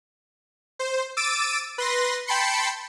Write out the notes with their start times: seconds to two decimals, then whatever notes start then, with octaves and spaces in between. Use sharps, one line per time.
0.79 C5
1.17 D6 E6 A6 D7 D#7
1.78 B4 C6 A#6
2.27 G5 A5 B5 C6 C#7